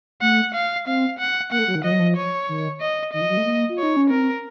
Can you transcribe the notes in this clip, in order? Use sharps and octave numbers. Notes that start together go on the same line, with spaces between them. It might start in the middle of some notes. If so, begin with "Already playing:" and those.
A3 F#5
F5
C4 F5
F#5
A#3 F#5
A3
F#3
D#3
F3 D#5
F#3
F3
C#5
D#3
D#5
D#3 D#5
F3
F#3
A3
A#3
F4
D#4 C#5
C#4
C4 A#4